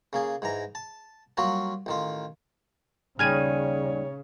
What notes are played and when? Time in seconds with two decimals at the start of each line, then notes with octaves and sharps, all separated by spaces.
0.13 C#3 A#3 G#4
0.42 G#2 E3 A#5
0.75 A5
1.37 F#3 G3 A#3 F4 F#4
1.86 A1 D#3 F4
3.19 D#2 C#3 G3 G#4 C#5 F6 G#6 D#7